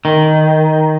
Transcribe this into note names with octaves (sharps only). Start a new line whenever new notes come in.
D#3